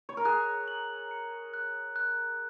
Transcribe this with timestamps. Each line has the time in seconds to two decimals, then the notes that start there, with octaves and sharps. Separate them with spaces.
0.09 C#5
0.17 A#4
0.25 G#4 F#6
0.68 F#7
1.11 C#7
1.54 F#6
1.96 F#6